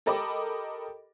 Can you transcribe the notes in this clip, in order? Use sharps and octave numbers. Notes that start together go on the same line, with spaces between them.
G4 A4 A#4 D#5 B5 D6